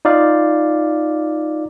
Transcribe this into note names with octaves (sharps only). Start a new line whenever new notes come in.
D#4 F4 D5 F5